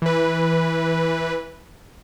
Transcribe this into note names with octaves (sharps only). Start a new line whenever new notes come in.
E3 B4